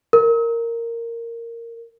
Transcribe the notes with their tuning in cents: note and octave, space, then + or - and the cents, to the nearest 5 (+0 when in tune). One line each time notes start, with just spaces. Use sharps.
A#4 -10